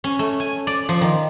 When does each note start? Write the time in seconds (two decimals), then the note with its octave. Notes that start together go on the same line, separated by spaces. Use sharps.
0.04 C#4
0.19 A3
0.40 G#5
0.67 D5
0.89 F3
1.01 D#3